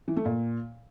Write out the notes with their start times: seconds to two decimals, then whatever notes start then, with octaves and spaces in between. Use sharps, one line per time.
0.08 E3
0.17 A3
0.25 A#2